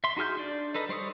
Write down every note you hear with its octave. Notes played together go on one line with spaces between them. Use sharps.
E5 C6
D#4 F#4 G#4 F6 G6
D4 D5
D#4 A4 B4 D#5
G3 C5 C#5 D#6